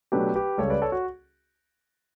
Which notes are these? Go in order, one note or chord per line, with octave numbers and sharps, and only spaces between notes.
B2 F#3 A3 D4 G4 B4
G4 B4
C#2 C#3 G3 A4 C#5
B4 D5
A4 C#5
F#4